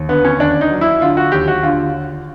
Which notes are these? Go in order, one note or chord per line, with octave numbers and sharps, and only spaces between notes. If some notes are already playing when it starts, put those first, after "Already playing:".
Already playing: D#2
D3 B3
C#4
D#2 D4
D#4
F#3
E4
D3 F4
F#4
D#2 G4
F#4
D3 F4